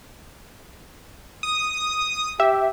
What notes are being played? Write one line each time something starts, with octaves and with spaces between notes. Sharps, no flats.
D#6
G4 E5